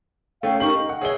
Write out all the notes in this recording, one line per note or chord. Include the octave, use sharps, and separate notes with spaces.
A3 C#4 F5 G5
D#4 G4 A#4 C#6 F#7
D#5
F#5
G#4 B4 C#5 E5 G7